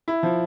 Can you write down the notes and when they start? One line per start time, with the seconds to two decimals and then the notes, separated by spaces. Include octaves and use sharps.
0.08 E4
0.23 F3